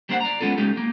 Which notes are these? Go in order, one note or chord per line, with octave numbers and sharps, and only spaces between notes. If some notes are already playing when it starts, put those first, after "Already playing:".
G3 A#3 D4 C5 F5 F#5
D5 A#5
G#3 B3 C#4 F4 A4
G#3 C#4 D#4 G4
A#3